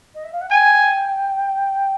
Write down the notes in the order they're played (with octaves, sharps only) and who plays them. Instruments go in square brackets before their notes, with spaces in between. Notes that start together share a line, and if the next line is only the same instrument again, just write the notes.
[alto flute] D#5
E5
F5
F#5
[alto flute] G5 [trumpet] G#5